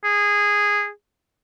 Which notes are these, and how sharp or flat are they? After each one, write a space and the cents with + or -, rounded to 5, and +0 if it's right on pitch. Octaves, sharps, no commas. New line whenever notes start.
G#4 -15